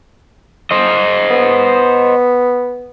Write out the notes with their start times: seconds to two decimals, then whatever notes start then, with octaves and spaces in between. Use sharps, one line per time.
0.71 C5 D#5
1.31 B3